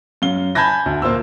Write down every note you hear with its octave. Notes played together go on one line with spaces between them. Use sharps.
F#2 F5 G7
G#5 A5 B5 G6 G#6 A#6
D2
A#2 A#3 F4 C5 E6